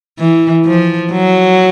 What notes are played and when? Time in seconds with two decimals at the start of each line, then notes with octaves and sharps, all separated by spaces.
0.19 E3
0.66 F3
1.12 F#3